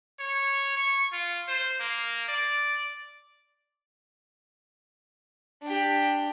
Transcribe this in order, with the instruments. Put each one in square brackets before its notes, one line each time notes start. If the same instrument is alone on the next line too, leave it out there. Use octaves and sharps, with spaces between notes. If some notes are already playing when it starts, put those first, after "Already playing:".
[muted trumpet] C#5
C#6
F4
C5
A#3
D5
[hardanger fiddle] D4 G4